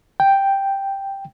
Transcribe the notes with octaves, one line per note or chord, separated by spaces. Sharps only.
G5